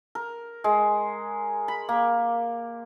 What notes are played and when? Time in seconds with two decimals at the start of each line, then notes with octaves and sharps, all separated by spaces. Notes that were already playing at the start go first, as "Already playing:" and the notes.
0.15 A#4
0.64 G#3
1.68 B5
1.89 A#3